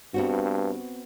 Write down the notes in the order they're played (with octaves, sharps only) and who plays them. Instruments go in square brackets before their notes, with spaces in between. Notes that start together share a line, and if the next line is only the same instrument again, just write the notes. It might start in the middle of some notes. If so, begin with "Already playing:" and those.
[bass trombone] G2 [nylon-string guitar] B3 C4 F#4